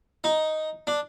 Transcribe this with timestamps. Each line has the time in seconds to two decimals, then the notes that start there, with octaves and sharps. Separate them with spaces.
0.24 D#4
0.87 D4